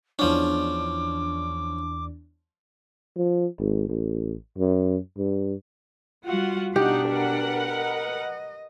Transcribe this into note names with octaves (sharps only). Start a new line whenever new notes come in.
E2 F3 C#4 D4 D6
F3
G#1
A1
F#2
G2
G3 F4 F#4 F#5
B2 D4 D#4 G4 F#5
A#4 B4 F#5
D#5